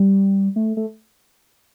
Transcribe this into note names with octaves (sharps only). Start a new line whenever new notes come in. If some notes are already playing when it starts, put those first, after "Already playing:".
Already playing: G3
A3
A3